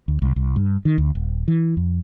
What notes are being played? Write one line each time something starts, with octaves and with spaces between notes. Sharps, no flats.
D2
C2
C2
G2
D#3
D2
D#1
E3
F2